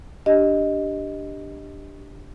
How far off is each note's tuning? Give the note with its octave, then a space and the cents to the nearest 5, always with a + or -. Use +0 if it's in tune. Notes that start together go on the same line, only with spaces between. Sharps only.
D4 +0 G4 +0 D#5 +0